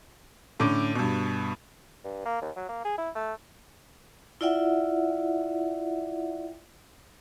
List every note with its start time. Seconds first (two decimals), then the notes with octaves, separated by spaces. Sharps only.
0.60 A2 D3 C#4 D6
0.95 G2 B2
2.04 G2
2.25 A#3
2.42 D#2
2.56 F#3
2.69 A#3
2.85 G#4
2.98 E4
3.15 A3
4.41 E4 F4 D5 E5 F#5 G5